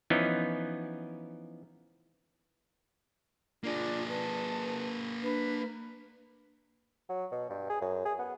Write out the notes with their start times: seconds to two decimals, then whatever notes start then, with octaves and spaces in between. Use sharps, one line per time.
0.10 E3 F3 B3 C#4 D#4
3.64 A#3 D4 F4 G#4
4.08 B4 A5
5.23 D4 B4
7.09 F#3
7.32 B2
7.50 G2
7.70 G#4
7.81 F#2
8.05 G#4
8.19 B3